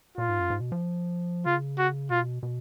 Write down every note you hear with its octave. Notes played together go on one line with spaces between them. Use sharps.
A#2 F4
G#2
F#2
G#2
B2
F3
C#3 F4
F#4
B2 F4
B2